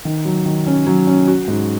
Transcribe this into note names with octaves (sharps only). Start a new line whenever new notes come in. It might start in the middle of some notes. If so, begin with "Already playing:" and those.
D#3
F#3
D#3
C#4
F#3
C#4
F#4
G#2